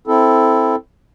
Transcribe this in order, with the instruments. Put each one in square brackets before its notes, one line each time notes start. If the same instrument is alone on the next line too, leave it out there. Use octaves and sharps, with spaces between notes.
[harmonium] C4 E4 A4